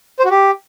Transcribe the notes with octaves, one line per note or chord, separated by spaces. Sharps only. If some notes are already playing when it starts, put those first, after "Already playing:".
C5
F#4
G4